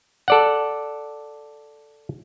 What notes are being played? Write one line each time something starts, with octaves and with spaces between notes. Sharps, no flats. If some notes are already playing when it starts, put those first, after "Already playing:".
A4 D5 F#5